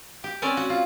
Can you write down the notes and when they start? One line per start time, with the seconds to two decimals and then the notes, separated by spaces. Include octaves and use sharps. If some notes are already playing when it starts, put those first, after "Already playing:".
0.24 G4
0.42 C4 C#4 C#5 D5 G#5
0.57 F#4
0.70 F4